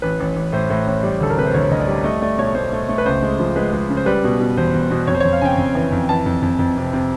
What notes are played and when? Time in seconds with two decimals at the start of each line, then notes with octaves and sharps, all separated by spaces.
0.02 A1 B4
0.20 A1
0.36 A1
0.52 A2 C5
0.70 A2
0.87 A1
1.03 G3
1.20 D2 A4
1.30 A#4
1.37 C3 B4
1.46 C5
1.54 D2 C#5
1.71 D2 D#5
1.80 D5
1.87 G3
2.04 A3 D#5
2.22 A3 D5
2.38 B1 C#5
2.55 A3 C5
2.72 A3
2.89 A3
2.98 B4
3.06 C#2 C5
3.23 G#3
3.40 F3
3.56 G#3 B4
3.73 G#3
3.90 C#3
3.97 C5
4.06 G3 B4
4.24 B2
4.40 B2
4.57 E2 C5
4.74 E2
4.91 B2
5.07 F2 C#5
5.14 C5
5.20 F2 C#5
5.32 F5
5.41 C#3 G#5
5.45 G5
5.58 F2
5.75 E3
5.92 F2
6.09 E3 A5
6.26 F2
6.42 F2
6.59 F2
6.76 C3
6.93 C3